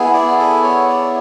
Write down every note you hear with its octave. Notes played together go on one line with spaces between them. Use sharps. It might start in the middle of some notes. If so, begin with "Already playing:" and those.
Already playing: B3 E4 G#4
D5
A4
C#5
D5